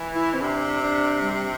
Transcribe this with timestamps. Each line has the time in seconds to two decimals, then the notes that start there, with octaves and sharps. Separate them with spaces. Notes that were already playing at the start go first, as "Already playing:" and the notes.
Already playing: E3
0.15 E4
0.34 C4
0.41 C3 D4
0.81 D4
1.21 G3